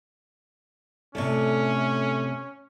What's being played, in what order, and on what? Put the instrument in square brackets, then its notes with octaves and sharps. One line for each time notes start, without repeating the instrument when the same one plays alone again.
[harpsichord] A2 D5 C#6 [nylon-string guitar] C3 A3 [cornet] C#4